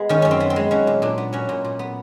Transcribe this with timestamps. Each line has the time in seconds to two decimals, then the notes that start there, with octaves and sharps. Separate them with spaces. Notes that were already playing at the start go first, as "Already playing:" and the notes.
Already playing: G#3 B3
0.09 D#3 C#4
0.22 F#2 C#4
0.31 C4
0.40 B3
0.50 C4
0.56 G#3
0.71 F#3 C#4
0.87 A#2
1.02 A#2 D4
1.18 B3
1.33 F#3 C#4
1.49 A#2
1.64 A#2
1.79 B3